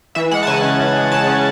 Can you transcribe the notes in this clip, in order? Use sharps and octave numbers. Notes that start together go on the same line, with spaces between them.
E3 E5
G#3 F#5
A5
C#3 G#5
C#4
E3
G#3
C#3 A5
C#4